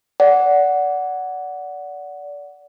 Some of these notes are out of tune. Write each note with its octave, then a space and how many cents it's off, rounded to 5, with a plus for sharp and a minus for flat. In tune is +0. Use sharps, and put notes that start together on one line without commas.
D5 -25 F#5 +0